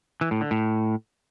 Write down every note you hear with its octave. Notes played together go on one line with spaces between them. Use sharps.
E3
A2
D3
A2